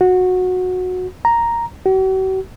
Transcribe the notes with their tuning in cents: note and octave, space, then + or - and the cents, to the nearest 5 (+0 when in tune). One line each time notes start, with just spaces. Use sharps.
F#4 -15
A#5 +0
F#4 +45